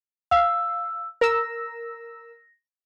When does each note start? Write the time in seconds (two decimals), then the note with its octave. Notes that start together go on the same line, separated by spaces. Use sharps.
0.31 F5 E6
1.21 A#4 E6 A#6